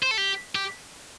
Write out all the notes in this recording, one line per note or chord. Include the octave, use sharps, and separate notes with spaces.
C5
A4
G4
G4